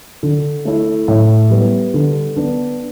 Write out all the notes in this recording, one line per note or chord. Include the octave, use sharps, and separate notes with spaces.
D3
A3 E4
A2
G3 B3
D3
B3 D4